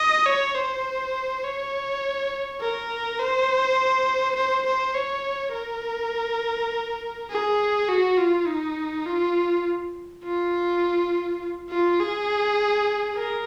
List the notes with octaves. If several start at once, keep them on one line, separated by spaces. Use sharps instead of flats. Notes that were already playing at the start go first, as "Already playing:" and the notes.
Already playing: D#5
C#5
C5
C#5
A#4
C5
C5
C5
C#5
A#4
G#4
F#4
F4
D#4
F4
F4
F4
G#4
A#4